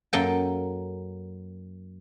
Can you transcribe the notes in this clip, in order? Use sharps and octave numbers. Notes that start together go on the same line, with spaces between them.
F#2 A#3 C#4 A4 G5 A5